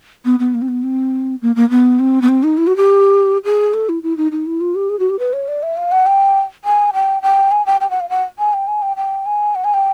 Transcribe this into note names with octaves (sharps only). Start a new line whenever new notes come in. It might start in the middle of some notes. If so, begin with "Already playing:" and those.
B3
B3
A#3
C4
B3
C4
A#3
A#3
B3
C4
B3
C4
D#4
E4
F#4
G4
G#4
A4
E4
E4
D#4
D#4
E4
F4
G4
G#4
F#4
G4
B4
C#5
D5
E5
F5
F#5
G5
G#5
G5
G5
G#5
G5
G5
F#5
F5
F#5
G#5
G5
G#5
G5
G5
G#5
F#5
G#5
G5